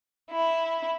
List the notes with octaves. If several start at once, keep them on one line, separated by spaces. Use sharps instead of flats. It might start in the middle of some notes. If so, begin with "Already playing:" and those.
E4